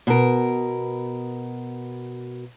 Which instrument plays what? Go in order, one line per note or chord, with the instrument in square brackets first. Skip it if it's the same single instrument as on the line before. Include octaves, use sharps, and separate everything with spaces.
[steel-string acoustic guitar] B2 A#4